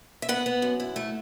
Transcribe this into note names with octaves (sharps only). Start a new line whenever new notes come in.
E5
B3 F#5
B3
F#2
E4
A3